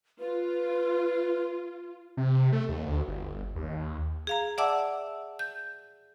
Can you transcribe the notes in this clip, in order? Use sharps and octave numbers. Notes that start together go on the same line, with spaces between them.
F4 B4
C3
A3
D#2
D2
G1
D#2
G#4 F5 A#5
D5 E5 F#5 A5 D6 E6
G6